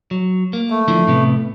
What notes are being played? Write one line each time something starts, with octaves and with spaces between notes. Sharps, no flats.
F#3
A#3
A3
D3 F3 E4
A2 C3 B3